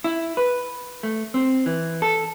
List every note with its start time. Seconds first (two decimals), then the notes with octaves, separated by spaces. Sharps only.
0.04 E4
0.37 B4
1.03 A3
1.34 C4
1.66 E3
2.02 A4